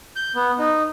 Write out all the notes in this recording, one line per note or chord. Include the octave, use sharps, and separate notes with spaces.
G6
B3
D#4